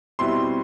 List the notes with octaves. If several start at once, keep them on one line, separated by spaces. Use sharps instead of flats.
B2 G3 C4 E4 C6